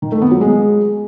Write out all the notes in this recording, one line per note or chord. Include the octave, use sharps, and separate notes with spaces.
D#3
A3
B3
F#3
G#3